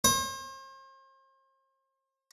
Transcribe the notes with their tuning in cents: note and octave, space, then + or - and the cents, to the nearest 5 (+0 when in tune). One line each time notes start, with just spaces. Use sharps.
C5 +40